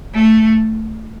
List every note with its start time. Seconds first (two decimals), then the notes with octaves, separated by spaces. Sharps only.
0.14 A3